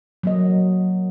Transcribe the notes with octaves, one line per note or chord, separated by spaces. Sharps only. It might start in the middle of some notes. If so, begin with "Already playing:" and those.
F#3 A#3 D#5